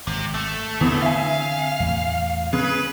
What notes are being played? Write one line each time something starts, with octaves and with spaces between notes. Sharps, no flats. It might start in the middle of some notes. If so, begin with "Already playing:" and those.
G#1 C3
A3
E2 D3 C4
E5 F5 G#5
E2 A2
C#3 B4